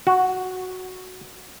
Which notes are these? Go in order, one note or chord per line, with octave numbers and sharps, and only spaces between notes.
F#4